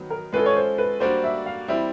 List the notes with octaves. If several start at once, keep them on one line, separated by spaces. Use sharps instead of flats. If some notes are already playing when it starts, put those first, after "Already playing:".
Already playing: D#3 F#3 B3
A#4
G#3 C#4 F4 A4 B4
C#5
C5
B4
G3 A#3 D4 F#4 C5
E5
F5
G3 C4 E4 E5